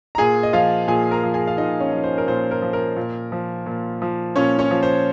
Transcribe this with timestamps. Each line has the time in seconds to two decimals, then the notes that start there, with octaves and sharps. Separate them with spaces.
0.15 A#5
0.18 A#2 G#4 G#5
0.43 D#5
0.53 F3 F4 F5
0.88 A#2 G#4 G#5
1.11 A#4 A#5
1.23 F3
1.34 G#4 G#5
1.47 F5
1.57 A#2 D#4 D#5
1.80 C#4 C#5
1.92 F3
2.04 C5
2.18 A#4
2.27 A#2 C5
2.51 A#4
2.62 F3
2.73 A#4
2.96 A#2
3.32 F3
3.66 A#2
4.02 F3
4.36 A#2 C#4 C#5
4.59 C#4 C#5
4.71 F3
4.83 C5